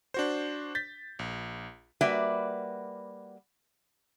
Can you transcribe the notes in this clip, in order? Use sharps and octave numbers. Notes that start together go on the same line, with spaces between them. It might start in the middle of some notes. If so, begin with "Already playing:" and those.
D4 F#4 C5
G6 A6 B6
A#1
G3 A#3 F#4 B4 D5 E5